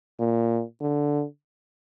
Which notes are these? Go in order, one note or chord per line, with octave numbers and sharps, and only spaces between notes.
A#2
D3